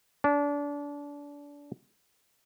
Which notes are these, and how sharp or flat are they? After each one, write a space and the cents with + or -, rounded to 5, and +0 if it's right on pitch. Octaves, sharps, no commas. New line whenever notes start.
D4 -30